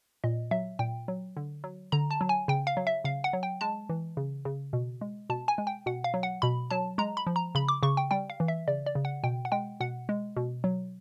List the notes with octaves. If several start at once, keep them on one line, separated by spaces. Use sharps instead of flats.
A#2 D#5
F#3 E5
A#2 G5
F#3
D3
F#3
D3 A#5
A5
F#3
G#5
C#3 G5
F5
F#3
E5
C#3 F5
F#5
F#3
G5
G#3 A5
E3
C#3
C#3
B2
G#3
B2 A5
G#5
G#3
G5
B2 F#5
F5
F#3
F#5
B2 B5
F#3 A5
G#3 A#5
B5
F3
A#5
C#3 B5
D6
C#3 C#6
G5
G3 G5
F5
E3
E5
C#3 D5
D5
C#3
F#5
B2 G5
F#5
G#3 G5
B2 F#5
G#3
B2
F#3